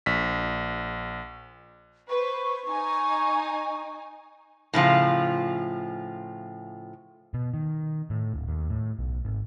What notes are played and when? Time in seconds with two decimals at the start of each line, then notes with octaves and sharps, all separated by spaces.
0.06 A#1 B6
2.10 B4 C5 C#6
2.66 D#4 G#5
4.73 A2 C#3 F3 F4
7.34 B2
7.54 D#3
8.10 A2
8.34 D1
8.47 D#2
8.69 A2
8.99 B1
9.25 G#1